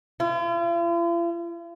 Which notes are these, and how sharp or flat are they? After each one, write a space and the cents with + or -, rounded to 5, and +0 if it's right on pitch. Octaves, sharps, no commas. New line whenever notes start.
F4 -45